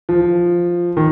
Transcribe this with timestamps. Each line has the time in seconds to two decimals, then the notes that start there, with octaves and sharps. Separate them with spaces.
0.09 F3
0.97 D#3